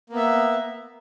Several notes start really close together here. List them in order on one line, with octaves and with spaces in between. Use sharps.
A#3 B3 E5